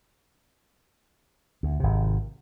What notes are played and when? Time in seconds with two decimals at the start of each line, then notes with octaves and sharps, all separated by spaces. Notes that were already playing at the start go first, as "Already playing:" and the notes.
1.63 D2
1.80 G#1 C3